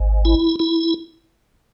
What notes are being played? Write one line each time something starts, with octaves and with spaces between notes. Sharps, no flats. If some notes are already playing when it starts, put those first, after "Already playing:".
Already playing: G#1
E4
E4